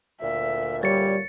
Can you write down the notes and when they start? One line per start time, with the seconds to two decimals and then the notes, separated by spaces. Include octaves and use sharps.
0.22 D2 A#2 E5
0.83 G3 C#5 A6 C#7